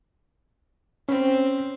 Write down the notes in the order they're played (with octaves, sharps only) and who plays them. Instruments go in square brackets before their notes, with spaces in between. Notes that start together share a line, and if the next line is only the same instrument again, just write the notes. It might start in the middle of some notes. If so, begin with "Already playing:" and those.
[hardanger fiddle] C4 [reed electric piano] C#4